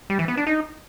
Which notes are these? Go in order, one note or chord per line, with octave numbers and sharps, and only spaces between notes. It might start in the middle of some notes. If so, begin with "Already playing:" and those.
G3
E3
B3
D4
D#4